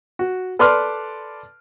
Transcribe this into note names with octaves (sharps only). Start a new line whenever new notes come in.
F#4
A4 B4 D5 C6 D6 F6